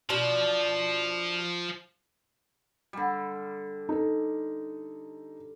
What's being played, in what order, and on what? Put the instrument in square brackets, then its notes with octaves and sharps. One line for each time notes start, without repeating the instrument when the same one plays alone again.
[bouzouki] B2 D4 [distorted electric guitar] F3
[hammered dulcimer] D3 G3
[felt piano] D#4 A4